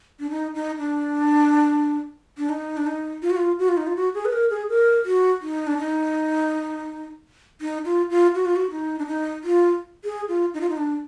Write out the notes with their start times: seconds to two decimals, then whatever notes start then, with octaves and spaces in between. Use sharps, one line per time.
0.19 D4
0.30 D#4
0.54 D#4
0.78 D4
2.38 D4
2.49 D#4
2.77 D4
2.86 D#4
3.22 F4
3.30 F#4
3.37 F4
3.59 F#4
3.69 F4
3.77 D#4
3.87 F4
3.96 F#4
4.14 G#4
4.25 B4
4.33 A#4
4.50 G#4
4.69 A#4
5.05 F#4
5.42 D#4
5.67 D4
5.78 D#4
7.61 D#4
7.85 F4
8.10 F4
8.35 F#4
8.45 F4
8.56 F#4
8.71 D#4
8.99 D4
9.07 D#4
9.44 F4
10.04 G#4
10.29 F4
10.54 D#4
10.61 F4
10.70 D#4
10.77 D4